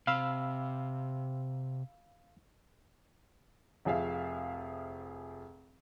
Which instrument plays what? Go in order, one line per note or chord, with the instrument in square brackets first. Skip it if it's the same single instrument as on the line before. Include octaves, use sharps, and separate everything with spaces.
[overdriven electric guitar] C3 [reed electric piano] F5 B5 E6
[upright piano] F1 F3 G#4 E5 F5